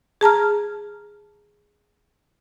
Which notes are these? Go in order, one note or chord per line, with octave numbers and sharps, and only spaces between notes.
G#4 A5 A#5 F6